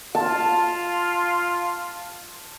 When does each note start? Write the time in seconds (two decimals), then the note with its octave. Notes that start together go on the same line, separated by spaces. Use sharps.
0.15 F4 A5